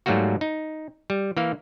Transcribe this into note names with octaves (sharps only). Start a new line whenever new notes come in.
G#2 F#3 G3 A3 A#3 F#4
D#4
G3
E3 A#3 F5